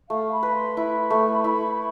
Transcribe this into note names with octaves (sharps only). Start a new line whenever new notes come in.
A3 F5
B5
B4
C6
E4 B5
A3
E4